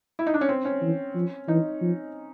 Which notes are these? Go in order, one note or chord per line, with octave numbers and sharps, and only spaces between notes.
E4
D#4
D4
C#4
C4
C#4
E3
F3
E3 D#4
F3